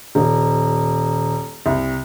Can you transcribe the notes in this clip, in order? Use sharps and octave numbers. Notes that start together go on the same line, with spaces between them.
D#1
C2